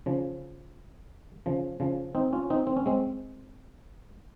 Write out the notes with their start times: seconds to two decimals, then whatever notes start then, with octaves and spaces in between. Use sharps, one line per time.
0.06 C#3 F3
1.46 C#3 F3
1.80 C#3 F3
2.15 C4 D#4
2.33 C#4 F4
2.50 C4 D#4
2.67 C4
2.77 C#4
2.86 G#3 C4